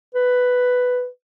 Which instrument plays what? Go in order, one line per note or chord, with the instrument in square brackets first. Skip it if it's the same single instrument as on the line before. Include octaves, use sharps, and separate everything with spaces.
[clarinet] B4